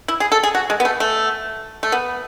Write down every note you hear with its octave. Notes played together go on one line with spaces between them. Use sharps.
E4
G#4
A4
G#4
F#4
G#3
B3
A3
A3
A3
B3